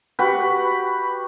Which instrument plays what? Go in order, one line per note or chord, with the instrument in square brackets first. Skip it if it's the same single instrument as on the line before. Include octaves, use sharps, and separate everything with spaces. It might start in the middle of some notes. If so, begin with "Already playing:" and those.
[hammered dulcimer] F#4 G4 B4